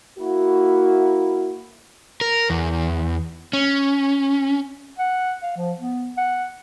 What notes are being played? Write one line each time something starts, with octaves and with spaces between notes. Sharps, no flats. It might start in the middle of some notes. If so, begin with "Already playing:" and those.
A#3 E4 F#4
A#4
E2
C#4
F#5
F5
F3
B3
F#5